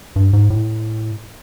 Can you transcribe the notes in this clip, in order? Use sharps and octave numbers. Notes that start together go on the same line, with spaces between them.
G2
G#2
A2